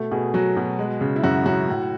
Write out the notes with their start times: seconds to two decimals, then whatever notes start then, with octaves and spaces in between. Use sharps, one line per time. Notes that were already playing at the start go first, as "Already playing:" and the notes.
Already playing: B2 A3
0.11 B2 G#4
0.34 F#3 F#4
0.57 B2
0.79 G#3
1.01 C#3
1.16 E4
1.23 F#2 F#4
1.46 F#2 F#4
1.68 A2